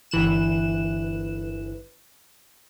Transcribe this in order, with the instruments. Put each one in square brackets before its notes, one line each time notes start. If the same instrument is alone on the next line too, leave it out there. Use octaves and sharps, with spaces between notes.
[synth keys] G1 E3 F#6 E7